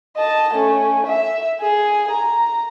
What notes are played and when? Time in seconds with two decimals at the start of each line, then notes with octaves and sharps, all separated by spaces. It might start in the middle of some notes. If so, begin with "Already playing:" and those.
0.17 D#5 A5
0.54 A3 C#4
1.07 E5
1.61 G#4
2.12 A#5